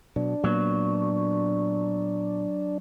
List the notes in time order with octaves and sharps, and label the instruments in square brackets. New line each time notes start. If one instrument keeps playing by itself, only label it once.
[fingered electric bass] B2 F#3 [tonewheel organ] D4
[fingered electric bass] A#2 A#3 B3 [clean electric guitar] F#3